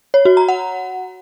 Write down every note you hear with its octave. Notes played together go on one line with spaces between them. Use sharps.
C#5
F#4
A#5
F#5